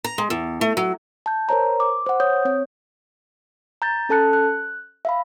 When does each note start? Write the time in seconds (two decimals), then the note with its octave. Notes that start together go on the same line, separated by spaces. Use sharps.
0.04 A#5
0.18 G#3
0.30 E2
0.61 A3
0.77 F#3
1.26 A5 G6
1.49 A#4 C5 C#5 A#5
1.80 D6
2.06 C5 F#5
2.20 C#5 D#6 G6
2.45 C4 C#5
3.82 A#5 G6 A6
4.09 C#4 A4 A5 F#6 C#7
4.33 F#6
5.05 E5 F5 B5